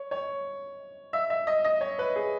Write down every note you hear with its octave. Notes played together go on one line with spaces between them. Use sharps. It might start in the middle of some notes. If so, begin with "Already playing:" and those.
Already playing: C#5
C#5
E5
E5
D#5
D#5
C#5
B4
G#4